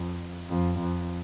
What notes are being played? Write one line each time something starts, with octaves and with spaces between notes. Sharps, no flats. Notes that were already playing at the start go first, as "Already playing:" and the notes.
Already playing: F2
F2
F2